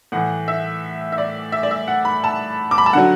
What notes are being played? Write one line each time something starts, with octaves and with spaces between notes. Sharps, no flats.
A2 E3 F#5
E5
E5
D5
E5
D5
E5
F#5
B5
A5
D6
B5
A5
D3 F#3 F#5